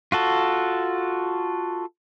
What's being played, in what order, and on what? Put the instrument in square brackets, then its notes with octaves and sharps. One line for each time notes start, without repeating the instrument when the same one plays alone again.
[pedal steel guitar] F4 F#4 A4